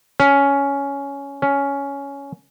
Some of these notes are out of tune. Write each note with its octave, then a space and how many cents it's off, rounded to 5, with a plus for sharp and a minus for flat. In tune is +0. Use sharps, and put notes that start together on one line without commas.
C#4 +10
C#4 +10